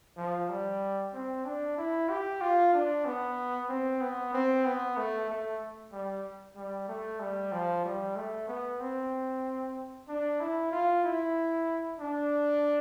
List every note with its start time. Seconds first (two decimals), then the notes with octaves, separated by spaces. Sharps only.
0.18 F3
0.50 G3
1.14 C4
1.45 D4
1.78 E4
2.10 G4
2.41 F4
2.74 D4
3.06 B3
3.69 C4
4.01 B3
4.33 C4
4.66 B3
4.97 A3
5.29 A3
5.92 G3
6.56 G3
6.88 A3
7.20 G3
7.53 F3
7.85 G3
8.16 A3
8.48 B3
8.80 C4
10.09 D4
10.40 E4
10.72 F4
11.04 E4
12.00 D4